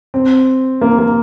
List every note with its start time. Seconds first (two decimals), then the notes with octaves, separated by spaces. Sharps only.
0.14 C4
0.81 A#3
0.99 A#3